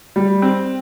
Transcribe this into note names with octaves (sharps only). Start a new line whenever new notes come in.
G3
C4